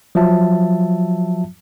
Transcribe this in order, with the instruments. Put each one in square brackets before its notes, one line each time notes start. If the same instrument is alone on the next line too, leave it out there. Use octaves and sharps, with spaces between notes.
[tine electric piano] F3 F#3 F4 E5 A5